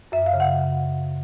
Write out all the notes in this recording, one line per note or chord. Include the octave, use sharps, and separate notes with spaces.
F#2 E5
F5
C#3
F#5